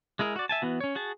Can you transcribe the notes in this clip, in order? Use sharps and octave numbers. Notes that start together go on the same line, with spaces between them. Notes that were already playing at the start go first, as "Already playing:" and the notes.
G#3 E4 G#4 A#4
F#4 D5
E5 G#5 A5
E3 B3 F#4
C#4 C#5
F#4 G#4 A5